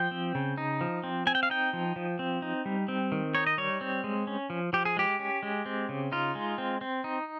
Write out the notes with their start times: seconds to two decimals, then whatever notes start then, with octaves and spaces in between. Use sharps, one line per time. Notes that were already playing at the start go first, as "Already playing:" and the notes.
Already playing: F3 G5
0.11 C4
0.35 C#3
0.58 D#4
0.81 F3
1.04 C4
1.27 C4 G#5
1.35 G5
1.43 F5
1.50 D#4 G5
1.73 F3
1.96 F3
2.19 C4
2.42 D#4
2.66 G3
2.88 C4
3.12 D#3
3.35 D#4 C#5
3.47 D#5
3.57 G3 C#5
3.81 C4
4.04 G#3
4.27 C#4
4.50 F3
4.73 F3 G4
4.85 G#4
4.97 G#3 G4
5.19 C#4
5.43 G#3
5.66 C4
5.89 C#3
6.12 D#4 F4
6.35 G#3
6.58 C4
6.81 C4
7.04 D#4